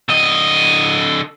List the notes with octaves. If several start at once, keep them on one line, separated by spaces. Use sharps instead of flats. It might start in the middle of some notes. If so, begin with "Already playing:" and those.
D3 D#5